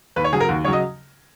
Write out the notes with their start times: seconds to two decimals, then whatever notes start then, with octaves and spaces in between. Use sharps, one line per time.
0.16 D#2 B4
0.24 C#5
0.33 C#3 F#3 G#4
0.40 A#4
0.48 D#2 F#4
0.65 C#3 F#3 C#5
0.73 D#5